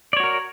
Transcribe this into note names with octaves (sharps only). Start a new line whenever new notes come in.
F#4 A#4 C#5 D5